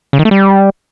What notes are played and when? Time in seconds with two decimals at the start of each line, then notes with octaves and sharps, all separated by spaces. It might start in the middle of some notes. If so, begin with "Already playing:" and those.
0.13 C#3
0.19 D#3
0.25 A3
0.31 G3